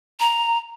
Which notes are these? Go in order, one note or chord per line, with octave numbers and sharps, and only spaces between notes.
A#5